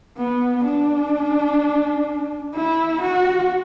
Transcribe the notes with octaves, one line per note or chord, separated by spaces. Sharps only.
B3
D4
E4
F#4